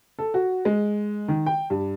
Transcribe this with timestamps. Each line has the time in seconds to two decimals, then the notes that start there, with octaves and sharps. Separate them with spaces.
0.19 A4
0.34 F#4
0.65 G#3
1.28 D#3
1.46 G5
1.70 G2